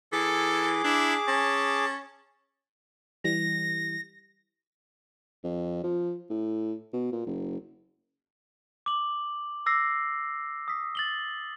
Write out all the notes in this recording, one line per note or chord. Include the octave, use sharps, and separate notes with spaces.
E3 G#4 A4 D6
D4 E4
C#4 A5
E3 G3 A#6
F2
F3
A2
B2
A#2
F#1
D6 F#7
D6 E6 A#6 C7
D#6 B6
A6 F#7 G7